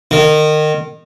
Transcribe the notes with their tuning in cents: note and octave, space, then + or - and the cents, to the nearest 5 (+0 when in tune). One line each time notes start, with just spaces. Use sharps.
D#3 -25